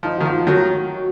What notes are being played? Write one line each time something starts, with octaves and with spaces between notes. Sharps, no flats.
F3 D#4
D#3 F#4
F3
F4
D#3 F#3 F#4